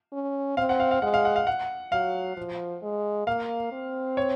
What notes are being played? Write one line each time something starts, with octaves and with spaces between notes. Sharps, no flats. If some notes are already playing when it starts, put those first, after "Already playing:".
C#4
C4 F5
F#5
F5
F5
G#3 F#5
F5
F#5
F5
F#5
F#3 F5
F3
G#3
A#3 F5
C4
C#5